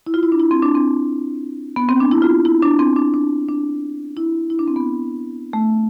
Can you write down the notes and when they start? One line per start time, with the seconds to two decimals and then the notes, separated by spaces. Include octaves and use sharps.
0.07 E4
0.14 F4
0.23 E4
0.32 D4
0.40 E4
0.51 C4
0.62 D4
0.75 C4
1.76 B3
1.89 C4
2.00 D4
2.11 E4
2.22 F4
2.45 E4
2.62 D4
2.79 C4
2.96 D4
3.14 D4
3.49 D4
4.17 E4
4.50 E4
4.59 D4
4.68 C4
4.76 B3
5.53 A3